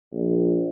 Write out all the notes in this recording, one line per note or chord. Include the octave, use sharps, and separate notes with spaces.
A#1